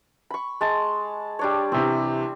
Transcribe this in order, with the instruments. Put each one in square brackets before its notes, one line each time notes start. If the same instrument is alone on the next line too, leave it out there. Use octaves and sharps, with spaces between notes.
[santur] B5 C#6
G#3 A5
G3 D4 C#5
[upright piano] C3 E3 [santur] C4